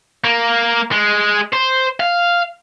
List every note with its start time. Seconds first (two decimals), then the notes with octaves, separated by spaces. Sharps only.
0.24 A#3
0.92 G#3
1.53 C5
2.00 F5